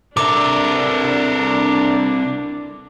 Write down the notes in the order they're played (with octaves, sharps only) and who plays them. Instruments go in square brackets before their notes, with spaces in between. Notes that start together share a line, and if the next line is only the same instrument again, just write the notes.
[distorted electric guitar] C2 E5 [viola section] D4 [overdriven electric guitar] A4 A#4 [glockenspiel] D6